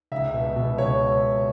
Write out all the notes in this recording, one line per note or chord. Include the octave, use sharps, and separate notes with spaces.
C#2 E5
B2
B2
C#2 C#5